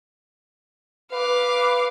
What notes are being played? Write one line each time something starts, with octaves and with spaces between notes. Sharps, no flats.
B4 F5 D6